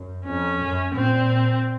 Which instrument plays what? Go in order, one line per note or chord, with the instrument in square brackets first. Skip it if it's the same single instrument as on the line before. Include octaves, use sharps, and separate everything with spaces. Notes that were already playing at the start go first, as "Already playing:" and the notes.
Already playing: [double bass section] F#2
[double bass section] F2 [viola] C#4
[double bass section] F#2
[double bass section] A#2 [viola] C4